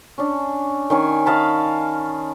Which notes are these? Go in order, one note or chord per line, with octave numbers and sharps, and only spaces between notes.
C#4 D4
D#3 C#4 G#5
D#5 F5 A5 B5